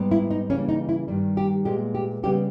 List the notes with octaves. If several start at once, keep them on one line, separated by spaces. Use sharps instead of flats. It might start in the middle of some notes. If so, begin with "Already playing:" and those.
Already playing: G#2 G3 B3
E4
D#4
C#3 E3 G3 A#3 C#4
D#4
E4
G2 D#3 G3
G4
A#2 G#3 B3 G4
G4
C#3 G3 B3 G4